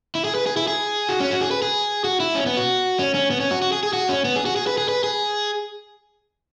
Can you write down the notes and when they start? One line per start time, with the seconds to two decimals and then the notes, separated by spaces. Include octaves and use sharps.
0.15 E4
0.25 G#4
0.35 B4
0.47 G#4
0.57 E4
0.68 G#4
1.09 F#4
1.20 C#4
1.31 F#4
1.41 G#4
1.51 B4
1.62 G#4
2.04 F#4
2.20 E4
2.35 C#4
2.46 B3
2.57 F#4
2.99 C#4
3.15 C#4
3.31 B3
3.40 C#4
3.51 F#4
3.62 F#4
3.72 G#4
3.83 G#4
3.93 F#4
4.09 C#4
4.25 B3
4.36 G#4
4.46 F#4
4.56 G#4
4.67 B4
4.78 G#4
4.89 B4
5.04 G#4